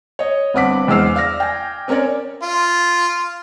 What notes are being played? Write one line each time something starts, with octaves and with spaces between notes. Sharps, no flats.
C#5 D#5
G1 G2 C4 F#5 D6 B6
E2 G#3 C5 E6 F6 C7
D5 F5 F6 A#6
G5 G#5
C4 C#4 A#4 C#5 D5
F4